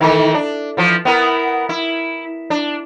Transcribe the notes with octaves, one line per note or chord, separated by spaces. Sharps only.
D#3 E3 A3
D4
E3 F3
B3 E4 A#4
E4
D4